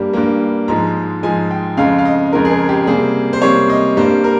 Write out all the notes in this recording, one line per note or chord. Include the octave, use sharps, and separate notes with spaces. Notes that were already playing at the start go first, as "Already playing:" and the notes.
Already playing: G2 G3 A#3
G2 G3 A#3
G#2 F3 G#3 A#5
G#2 F3 G#3 G#5
G5
F2 C#3 G#3 F5
F5
D#5
F2 C#3 G#3 A#4
G#4
A#4
G4
C3 G3 A#3 G#4
C5
C3 G3 A#3 C#5
D#5
G2 G3 A#3 C5
A#4